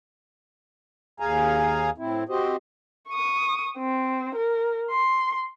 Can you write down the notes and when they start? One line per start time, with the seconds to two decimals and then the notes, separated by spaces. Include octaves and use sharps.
1.20 D#2 G#4 F5 G#5 A#5
1.98 A2 C4 E4
2.29 C4 F#4 G4 C5 D#5
3.10 C#6 D#6
3.78 C4
4.36 A#4
4.91 C6